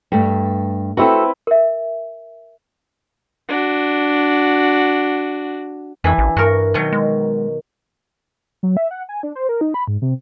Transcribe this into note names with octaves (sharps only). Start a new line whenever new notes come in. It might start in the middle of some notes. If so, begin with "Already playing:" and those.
G2 A3
C4 E4 F#4 G4 A4 B4
A#4 E5
D4 F#4
F2 E3 D4 E4
A1
G2 F#4 A#4
B2 D#3 F#3
G#3
F#3
E5
F#5
G#5
D4
C5
A#4
D#4
B5
G#2
C3